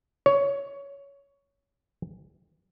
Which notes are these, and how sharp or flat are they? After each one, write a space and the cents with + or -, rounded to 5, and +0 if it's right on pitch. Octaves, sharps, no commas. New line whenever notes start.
C#5 +15